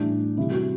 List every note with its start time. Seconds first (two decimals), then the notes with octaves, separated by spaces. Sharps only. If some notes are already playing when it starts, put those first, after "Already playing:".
Already playing: A2 E3 G3 D4
0.37 C3 E3 G3 E4
0.51 F#4